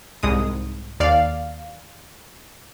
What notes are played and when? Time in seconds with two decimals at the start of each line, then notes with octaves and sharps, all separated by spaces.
0.23 C2 G#2 D#6
1.00 D#2 D5 F5